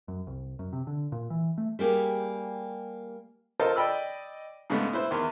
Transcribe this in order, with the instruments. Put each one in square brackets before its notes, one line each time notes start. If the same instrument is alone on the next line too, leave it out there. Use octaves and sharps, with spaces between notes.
[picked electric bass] F#2
C2
F#2
C3
D3
A#2
E3
A3
[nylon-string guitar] G3 A#3 G4 G#4
[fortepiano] F4 A4 A#4 C5 D#5
D5 D#5 G5 B5 E6
G#2 C#3 G#3 A3 B3
E4 B4 C5
E2 D#3 C6